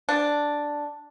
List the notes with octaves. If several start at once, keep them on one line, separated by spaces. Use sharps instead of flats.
D4